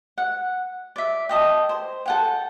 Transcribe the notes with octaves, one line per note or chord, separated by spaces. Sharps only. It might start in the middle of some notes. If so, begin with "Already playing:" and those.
F#5
D5 E5
A4 D#5 G5
C5
A4 F#5 G5